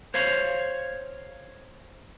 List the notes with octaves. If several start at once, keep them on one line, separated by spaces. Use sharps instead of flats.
C5 C#5 F5